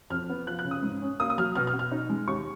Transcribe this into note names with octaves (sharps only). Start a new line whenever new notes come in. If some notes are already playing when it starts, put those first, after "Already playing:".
F2 F6
B3
F3 F#6
F#6
C#3
D#6
G#2
C#4
A#3 D#6
D#6
F#3 F6
B2 F6
F6
B2
F6
D#4
G#3
D#2 C#6